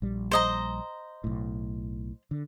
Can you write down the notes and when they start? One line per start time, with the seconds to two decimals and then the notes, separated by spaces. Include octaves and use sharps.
0.02 A#1 G3
0.31 C5 D#5 A#5
1.24 B1 A2
2.31 D3